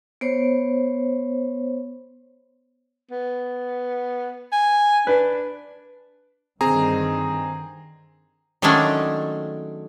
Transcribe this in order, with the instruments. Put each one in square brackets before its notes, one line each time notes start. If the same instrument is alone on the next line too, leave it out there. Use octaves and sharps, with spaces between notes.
[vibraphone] B3 C5 C#5
[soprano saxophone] B3
G#5
[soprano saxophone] D4 [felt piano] B4
[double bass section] G2 D3 D#3 [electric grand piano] C4 G#4 A#5
[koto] D#3 F#3 G#3 A3 C#4 D4